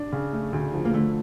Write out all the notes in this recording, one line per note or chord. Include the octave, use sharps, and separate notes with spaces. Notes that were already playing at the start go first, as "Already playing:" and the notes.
Already playing: D4
C#3
A3
D2
F3
A#3
D3 A3